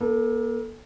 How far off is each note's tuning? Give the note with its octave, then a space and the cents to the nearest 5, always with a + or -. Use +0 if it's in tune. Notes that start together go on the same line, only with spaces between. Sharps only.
A#3 +40 A4 +0